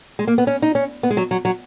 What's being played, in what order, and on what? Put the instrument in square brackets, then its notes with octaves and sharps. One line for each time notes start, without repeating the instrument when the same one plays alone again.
[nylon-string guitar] G#3
A#3
B3
C#4
D#4
C#4
B3
G#3
F#3
F#3
F#3